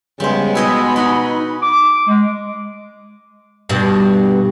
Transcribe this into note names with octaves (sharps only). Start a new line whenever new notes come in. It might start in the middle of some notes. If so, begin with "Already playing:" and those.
C#3 G3 G#3 B3 C5
B2 E4 G#4 D#5 B5
D#4 F#4 G#4
D6
G#3
G2 B2